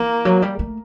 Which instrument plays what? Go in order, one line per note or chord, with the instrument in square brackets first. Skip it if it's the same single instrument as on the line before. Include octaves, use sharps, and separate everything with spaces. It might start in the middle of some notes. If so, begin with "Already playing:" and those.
Already playing: [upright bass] E3 [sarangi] A#3
[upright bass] F#3
G3
A3